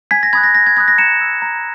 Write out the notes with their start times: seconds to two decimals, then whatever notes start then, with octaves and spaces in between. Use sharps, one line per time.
0.11 G#5 G#6 B6
0.23 A#6
0.33 B5 D#6 F#6 G#6
0.43 A#6
0.55 G#5 A#6
0.66 G#6
0.77 B5 D#6 F#6 G#6
0.88 A#6
0.98 A#5 C#7 E7
1.21 E6
1.42 A#5